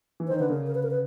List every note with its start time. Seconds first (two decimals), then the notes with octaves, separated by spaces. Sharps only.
0.20 E3
0.28 D#3 C5
0.40 D3 B4
0.49 C#3 A#4
0.67 A#4
0.75 B4
0.83 A#4
0.91 B4